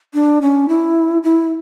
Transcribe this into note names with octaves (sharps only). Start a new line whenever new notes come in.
D4
C#4
E4
E4